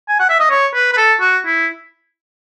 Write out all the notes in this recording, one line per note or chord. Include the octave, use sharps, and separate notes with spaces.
G#5
F#5
E5
D#5
C#5
B4
B4
A4
F#4
E4